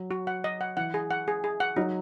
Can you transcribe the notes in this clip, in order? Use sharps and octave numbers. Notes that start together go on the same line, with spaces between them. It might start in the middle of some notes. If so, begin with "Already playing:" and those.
Already playing: F#3
F#4
F#5
D#5
F#5
E3 F#5
G#4
F#5
G#4
G#4
F#5
F#3 D#4